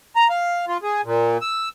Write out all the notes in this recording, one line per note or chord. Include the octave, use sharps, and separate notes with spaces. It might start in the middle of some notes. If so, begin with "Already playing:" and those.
A#5
F5
F4
G#4
A#2
E6